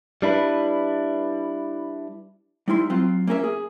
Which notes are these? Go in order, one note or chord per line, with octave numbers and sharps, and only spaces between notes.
G3 D4 E4 B4
G3 D#4 E4 C6
F#3 C4 F4
A#3 C#4 A#4 E5
G#4